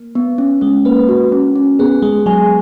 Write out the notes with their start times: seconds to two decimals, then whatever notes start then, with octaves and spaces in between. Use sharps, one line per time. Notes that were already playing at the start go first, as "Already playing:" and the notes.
Already playing: A#3
0.15 B3
0.38 C#4
0.61 G#3 C#4
0.85 A#3 B4
1.09 F#4
1.32 C#4
1.56 C#4
1.79 B3 G#4
2.02 G#3 G#4
2.26 F#3 G#5